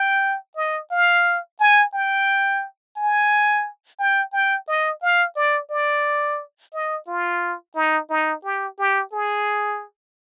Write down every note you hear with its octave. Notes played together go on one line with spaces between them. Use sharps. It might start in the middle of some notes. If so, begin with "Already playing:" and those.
Already playing: G5
D#5
F5
G#5
G5
G#5
G5
G5
D#5
F5
D5
D5
D#5
F4
D#4
D#4
G4
G4
G#4